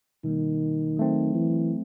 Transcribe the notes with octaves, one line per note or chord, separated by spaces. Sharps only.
B2 D#3 G3 A#3
F#3 A3 C4
E3